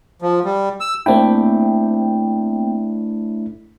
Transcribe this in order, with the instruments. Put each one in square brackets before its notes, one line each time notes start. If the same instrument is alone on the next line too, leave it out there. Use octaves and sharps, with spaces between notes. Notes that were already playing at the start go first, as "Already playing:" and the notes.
[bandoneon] F3
G3
E6
[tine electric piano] A3 D4 E4 [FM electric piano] A#3 C4 G5